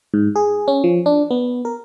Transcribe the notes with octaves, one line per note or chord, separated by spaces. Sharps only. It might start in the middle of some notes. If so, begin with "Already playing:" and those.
G#2
G#4
C#4
F3
D4
B3
A#4